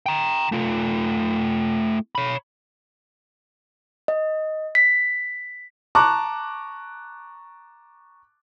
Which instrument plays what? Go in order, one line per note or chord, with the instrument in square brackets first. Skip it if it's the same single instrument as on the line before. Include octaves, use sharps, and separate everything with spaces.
[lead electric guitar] G5 A#5
A3 F4
C#5 B5
[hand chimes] D#5
B6
[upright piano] A5 A#5 C#6 D6 F#6